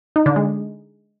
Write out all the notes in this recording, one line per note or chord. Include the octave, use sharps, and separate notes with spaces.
D#4
D3
G#3